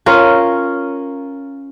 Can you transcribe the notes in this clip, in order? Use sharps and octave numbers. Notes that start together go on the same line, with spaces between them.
C#4 F4 A#4